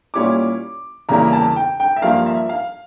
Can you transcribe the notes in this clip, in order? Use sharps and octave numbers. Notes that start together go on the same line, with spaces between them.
A#2 G3 C#4 E4 D6
E2 C#3 G3 A#3 E4 A#5
A5
G5
G5
E5
G2 F3 A#3 F5
E5
F5